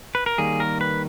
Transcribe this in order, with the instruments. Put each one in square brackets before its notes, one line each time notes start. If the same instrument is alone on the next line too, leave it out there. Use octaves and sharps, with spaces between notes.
[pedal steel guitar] B4
A#4
D#3 G3 A#3 G#4
A#4
B4